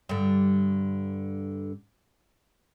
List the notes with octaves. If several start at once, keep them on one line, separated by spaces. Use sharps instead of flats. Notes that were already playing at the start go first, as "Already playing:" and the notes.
G2 D3